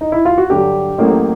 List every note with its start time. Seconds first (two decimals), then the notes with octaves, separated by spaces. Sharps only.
0.01 D#4
0.12 E4
0.25 F4
0.38 F#4
0.50 G2 D3 F#3 G4
0.98 A1 A2 F#3 A#3